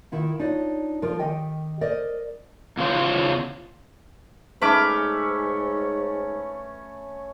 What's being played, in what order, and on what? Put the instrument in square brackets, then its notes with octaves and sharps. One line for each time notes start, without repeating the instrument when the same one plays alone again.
[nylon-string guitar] D#3 E4 F4
D4 D#4 F4 C#5 D5
F3 F4 A#4
D#3 G4 D#5 G5
A#4 C5 D5 D#5
[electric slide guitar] E2 C#3 F4 C5 C#5
[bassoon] G#2 [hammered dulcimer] A3 C#4 B5 [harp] B4 D6 F6